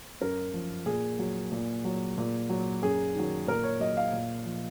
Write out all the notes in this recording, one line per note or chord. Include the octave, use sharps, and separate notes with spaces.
F#2 A#4
F3
A#2 G#4
F#3
A#2
F#3
A#2
F#3
F#2 G#4
D#3 F#3
A#2 A#4
C#5
F#3 D#5
F5
A#2
F3